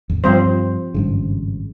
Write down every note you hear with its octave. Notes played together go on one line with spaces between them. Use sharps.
A1 E2
G2 F3 G3 C4 C5
G#1 G2 C#3